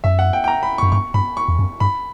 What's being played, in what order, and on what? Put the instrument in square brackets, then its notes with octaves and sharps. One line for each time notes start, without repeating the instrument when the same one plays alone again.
[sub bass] F#2 [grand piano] E5
[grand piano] F#5
G5
G5
A#5
B5
[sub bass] F#2 [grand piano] C#6
[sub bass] G2 [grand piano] C#6
[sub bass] G2 [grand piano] B5
[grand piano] C#6
[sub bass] E2
F#2
[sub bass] G2 [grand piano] B5